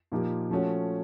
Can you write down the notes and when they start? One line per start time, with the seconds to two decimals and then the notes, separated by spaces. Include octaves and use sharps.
0.12 A#2 F3 A#3 D#4 G4
0.50 F3 A3 C#4 F#4